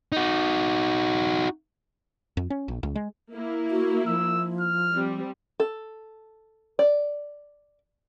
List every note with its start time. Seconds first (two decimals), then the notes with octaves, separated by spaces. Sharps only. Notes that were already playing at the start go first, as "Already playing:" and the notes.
0.12 D#4 F#4
2.37 F2
2.50 C#4
2.68 A#1
2.83 C#2
2.95 G#3
3.31 A#3 E4
3.71 F#4
4.07 F3 E6
4.60 F6
4.95 G3 C4
5.60 A4
6.79 D5